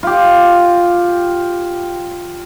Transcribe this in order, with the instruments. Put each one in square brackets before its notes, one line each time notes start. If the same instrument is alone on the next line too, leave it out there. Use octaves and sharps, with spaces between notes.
[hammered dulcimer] F4 G4